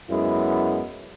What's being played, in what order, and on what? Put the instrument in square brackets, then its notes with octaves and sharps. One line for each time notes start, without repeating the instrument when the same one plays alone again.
[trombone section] F#2 G#3 B3 E4